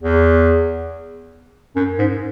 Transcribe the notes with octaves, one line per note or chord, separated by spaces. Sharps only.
E2
F#2
G#2